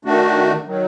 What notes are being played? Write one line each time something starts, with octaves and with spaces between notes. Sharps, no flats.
D#3 A3 D4 F#4
D#3 F#3